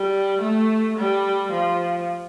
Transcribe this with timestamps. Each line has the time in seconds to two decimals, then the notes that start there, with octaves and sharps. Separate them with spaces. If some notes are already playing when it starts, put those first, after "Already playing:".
Already playing: G3
0.41 A3
0.97 G3
1.52 F3